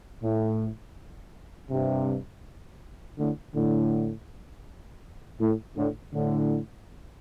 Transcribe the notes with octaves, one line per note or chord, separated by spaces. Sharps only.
A2
G2 C3
A2 D3
A2 D3
A2
A2 D3
A2 D3